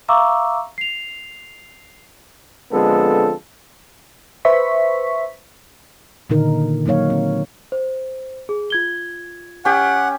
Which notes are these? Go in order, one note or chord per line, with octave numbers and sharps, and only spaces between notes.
E5 F5 A#5 C#6 D6 E6
C7 F7
D3 F3 G#3 B3 C4 A4
B4 C5 E5 C#6 B6
A#2 D3 D#3 D#4 A#4
F#3 A#3 D#4 C#5 F5
C4
C5
G#4
F4 G#6 G7
C#4 G4 F#5